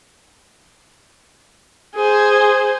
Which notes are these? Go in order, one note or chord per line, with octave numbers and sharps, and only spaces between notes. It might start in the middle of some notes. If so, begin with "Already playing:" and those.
G#4 C5